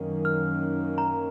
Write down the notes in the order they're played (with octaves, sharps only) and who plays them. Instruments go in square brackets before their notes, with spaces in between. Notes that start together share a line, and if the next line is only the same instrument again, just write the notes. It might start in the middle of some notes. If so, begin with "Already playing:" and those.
Already playing: [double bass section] F#2 D#3 A#3 C#4
[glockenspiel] F6
A#5